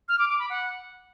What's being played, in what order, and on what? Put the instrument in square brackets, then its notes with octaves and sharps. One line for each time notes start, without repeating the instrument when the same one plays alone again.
[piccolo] F6
D6
D6
B5
F#5